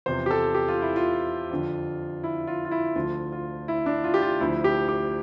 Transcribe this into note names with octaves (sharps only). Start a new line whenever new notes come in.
E2 C3 F3 C5
G4
A4
G4
F4
E4
F4
F2 D3 F3
E4
F4
F4
E4
D2 D3 F3 F4
F4
E4
D4
F4
G4
F4
D2 D3 F3 E4
G4
G4